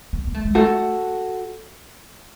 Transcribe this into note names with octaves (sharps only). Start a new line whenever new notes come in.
B3
B3
A3
G#3
A3 F#4 A4